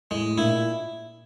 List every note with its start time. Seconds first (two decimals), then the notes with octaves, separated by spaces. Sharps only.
0.11 A2 G#3
0.38 A#2 E4